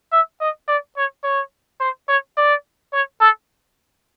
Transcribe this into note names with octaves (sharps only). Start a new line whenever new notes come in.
E5
D#5
D5
C#5
C#5
C5
C#5
D5
C#5
A4